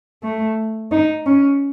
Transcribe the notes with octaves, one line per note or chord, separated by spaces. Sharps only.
A3
D#4
C#4